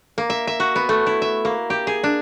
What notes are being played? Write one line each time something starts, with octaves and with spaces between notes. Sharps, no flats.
A#3
E5
E5
F#4
B3
A3
E4
E5
A#3
G4
G#4
D4